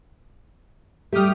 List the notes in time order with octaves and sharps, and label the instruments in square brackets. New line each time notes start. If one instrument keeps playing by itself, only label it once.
[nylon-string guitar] G3 A3 [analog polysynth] G4 D#6 F6